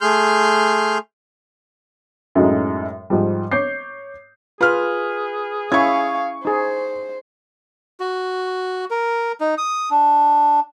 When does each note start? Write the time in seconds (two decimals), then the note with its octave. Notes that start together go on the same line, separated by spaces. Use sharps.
0.01 A3 G#4 C6 F6 G6
2.35 F#2 A2 F#3 G#3 D#4
3.10 G#2 F3 G3
3.52 C#5 D6 G6 C7
4.61 F4 G#4 B4 F6
5.72 C#4 E4 E5 F5 C#6 G#6
6.45 D#4 G#4 C5
8.00 F#4
8.91 A#4
9.40 D#4
9.58 D#6
9.90 D4